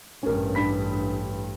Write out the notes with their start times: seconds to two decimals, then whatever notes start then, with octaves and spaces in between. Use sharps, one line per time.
0.23 A1 G2 C#4 A#4
0.55 D4 B5 B6